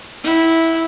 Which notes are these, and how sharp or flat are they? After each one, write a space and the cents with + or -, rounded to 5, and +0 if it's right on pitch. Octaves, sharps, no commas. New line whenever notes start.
E4 -10 F#5 +40